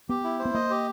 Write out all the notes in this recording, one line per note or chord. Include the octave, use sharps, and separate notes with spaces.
B3 G4
E4
C5
B3
A#3 D#5
G4